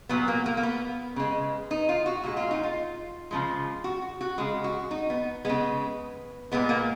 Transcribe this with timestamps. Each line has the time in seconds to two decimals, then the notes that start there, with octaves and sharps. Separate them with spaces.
0.09 A#2 F#3 B3
0.28 A#3
0.46 A#3
0.57 A#3
0.63 B3
1.16 C#3 G#3
1.71 D#4
1.89 F4
2.06 F#4
2.24 A#2 G#3 F#4
2.37 F4
2.51 D#4
2.63 F4
3.31 C#3 F3 G#3
3.84 F#4
4.21 F#4
4.38 C#3 G#3 G#4
4.64 F#4
4.91 D#4
5.10 B3
5.45 C#3 G#3 B3
6.52 A#2 G#3 B3
6.69 A#3